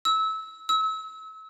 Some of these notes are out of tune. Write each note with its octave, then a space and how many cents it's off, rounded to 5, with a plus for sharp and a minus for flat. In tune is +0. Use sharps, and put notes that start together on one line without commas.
E6 -25
E6 -35